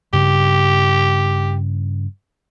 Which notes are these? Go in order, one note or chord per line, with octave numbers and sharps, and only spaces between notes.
G2 C#3 G4